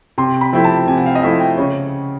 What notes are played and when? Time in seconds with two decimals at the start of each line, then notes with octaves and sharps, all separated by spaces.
0.18 C3 C6
0.41 B5
0.52 F3 A3 C4 E4
0.64 A5
0.88 C3 G#5
0.97 F#5
1.06 F5
1.15 D#5
1.22 F3 A3 C4 E4 E5
1.40 G5
1.57 C#3 C#5